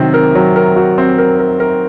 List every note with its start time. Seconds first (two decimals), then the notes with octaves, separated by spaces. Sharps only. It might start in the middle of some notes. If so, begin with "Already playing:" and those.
Already playing: C3 D#3 F#3 C4
0.14 A#4
0.35 F#3
0.56 A#4
0.76 F#4
0.98 C4
1.18 A#4
1.39 A#4
1.60 A#4